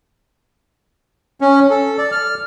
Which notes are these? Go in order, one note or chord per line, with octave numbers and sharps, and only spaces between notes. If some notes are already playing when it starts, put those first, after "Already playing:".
C#4
A4
D5
F6